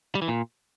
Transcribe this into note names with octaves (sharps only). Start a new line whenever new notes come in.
G3
E3
A#2